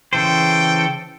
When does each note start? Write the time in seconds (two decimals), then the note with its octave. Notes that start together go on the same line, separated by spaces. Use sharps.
0.13 C#3 E3 A4 C5 G5